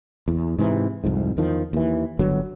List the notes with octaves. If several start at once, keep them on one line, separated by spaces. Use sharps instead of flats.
E2
G#2 C3 E3
C2 F2 G#2
E2 D#3 F3
D#2 E3
G1 D3 F#3 B3